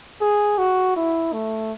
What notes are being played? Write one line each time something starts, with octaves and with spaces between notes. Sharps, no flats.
G#4
F#4
E4
A3